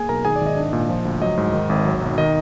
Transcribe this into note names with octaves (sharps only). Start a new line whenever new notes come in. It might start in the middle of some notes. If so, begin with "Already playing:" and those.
Already playing: A#3 G#4 G#5
B1 A#4 A#5
D#3 G#4 G#5
D5
G#1
D#5
D4
A#2
F3
D2
F#3 D#5
G#2
D#3
G#1
F#3
B1
D#3 D#5